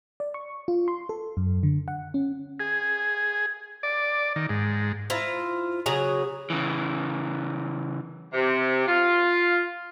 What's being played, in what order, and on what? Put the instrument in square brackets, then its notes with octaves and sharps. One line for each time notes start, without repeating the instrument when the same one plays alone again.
[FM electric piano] D5
C#6
F4
C6
A4
F#2
D3
F#5
C#4
[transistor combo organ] G#4
D5
D#3
G#2
[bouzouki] E4 F4 C5 A#5
C#3 F#3 G#4 A#5
[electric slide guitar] C#3 E3
[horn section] C3
F4